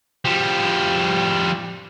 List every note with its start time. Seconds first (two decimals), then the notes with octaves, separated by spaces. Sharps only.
0.25 F3 G3